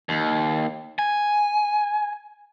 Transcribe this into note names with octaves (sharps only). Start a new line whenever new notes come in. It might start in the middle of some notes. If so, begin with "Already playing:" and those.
D#2
G#5